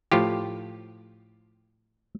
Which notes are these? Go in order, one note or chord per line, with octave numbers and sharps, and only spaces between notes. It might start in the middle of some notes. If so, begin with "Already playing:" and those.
A2 F3 F4 G4